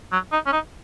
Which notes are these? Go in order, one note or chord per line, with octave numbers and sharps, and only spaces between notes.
F#3
D#4
C#4
D#4